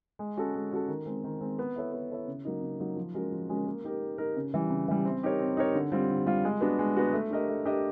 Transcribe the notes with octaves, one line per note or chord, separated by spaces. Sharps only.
G#3
C#4 F#4 A4
G#3
C#4 F#4 A4
D#3
G#3 C4
D#3
G#3 C4
B3
E4 A4 C#5 E5
B3
E4 A4 C#5 E5
C#3
F#3 A#3 D#4
C#3
F#3 A#3 D#4
F3
G#3 C#4 F#4 A#4
F3
G#3 C#4 F#4 A#4
A#3
D#4 G4 A#4
A#3
D#4 G4 A#4
C#3
E3 G3
C#3
E3 G3
C4
D#4 G4 A#4 C#5
C4
D#4 G4 A#4 C#5
D3
G3 C4 F4
D3
G3 C4 F4
G#3
B3 D4 F#4
G#3
B3 D4 F#4
A3
D4 G4 A#4 D#5
A3
D4 G4 A#4 D#5